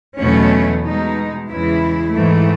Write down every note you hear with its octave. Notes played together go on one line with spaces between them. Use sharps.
E2 B2 F#3 A3 C#4
B2 G#3 D#4
E2 C#3 E3 G#3 E4
G#2 E3 A3